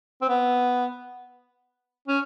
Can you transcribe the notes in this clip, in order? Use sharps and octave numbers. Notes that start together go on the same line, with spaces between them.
C4
B3
C#4